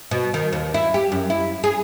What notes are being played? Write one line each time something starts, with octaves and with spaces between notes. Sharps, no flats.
B2
D#3
D#2
E4
G4
F#2
E4
G#4